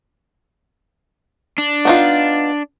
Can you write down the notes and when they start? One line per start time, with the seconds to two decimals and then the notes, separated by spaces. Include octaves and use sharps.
1.58 D4
1.85 B3 D#4 F4